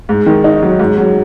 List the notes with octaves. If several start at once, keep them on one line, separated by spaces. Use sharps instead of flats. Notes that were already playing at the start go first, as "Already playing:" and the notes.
G#2
D#3
D#4
F#3
G#2
F#3